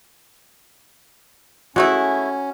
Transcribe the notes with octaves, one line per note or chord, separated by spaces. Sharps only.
G#3 A3 C#4 E4 F#4